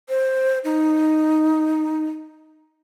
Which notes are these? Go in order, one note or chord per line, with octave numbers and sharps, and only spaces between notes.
C5
D#4